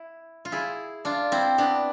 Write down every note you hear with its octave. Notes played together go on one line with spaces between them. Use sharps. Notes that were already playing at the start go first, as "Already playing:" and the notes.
Already playing: E4
F4
E4 G#4
D4 F4
C4 E4
B3 D4